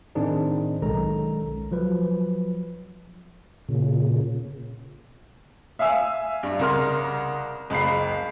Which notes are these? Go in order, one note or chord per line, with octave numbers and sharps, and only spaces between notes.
A2 D#3 C4 D4 D#4 G#4
B1 D#3 G#3 C#4 A4 A#5
F3 F#3 B4
A#2 C#3
E5 F5 G#5 E6
G2
C2 C#3 A#4 C6 F6
F#1 C#2 B5 C7